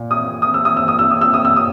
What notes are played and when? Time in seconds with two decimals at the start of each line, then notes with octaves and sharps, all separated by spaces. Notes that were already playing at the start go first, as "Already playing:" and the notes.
Already playing: A#2
0.11 D#6
0.42 D#6
0.54 E6
0.65 D#6
0.77 E6
0.88 D#6
0.99 E6
1.11 D#6
1.21 E6
1.34 D#6
1.45 E6
1.56 D#6